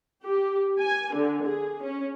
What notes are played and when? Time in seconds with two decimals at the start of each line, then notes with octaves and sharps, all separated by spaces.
0.24 G4
0.80 G#5
1.13 D3
1.44 G#4
1.83 C#4